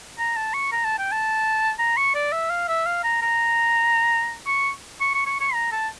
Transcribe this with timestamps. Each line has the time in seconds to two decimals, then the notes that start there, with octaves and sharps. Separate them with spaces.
0.19 A#5
0.36 A5
0.54 C#6
0.72 A#5
0.85 A5
0.99 G5
1.12 A5
1.79 A#5
1.97 C#6
2.15 D5
2.33 E5
2.50 F5
2.68 E5
2.86 F5
3.04 A#5
3.22 A#5
4.47 C#6
5.01 C#6
5.14 C#6
5.27 C#6
5.40 C#6
5.54 A#5
5.72 A5